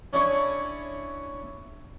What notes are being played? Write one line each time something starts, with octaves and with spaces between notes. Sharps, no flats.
C#4 D4 E4 G#4 C#5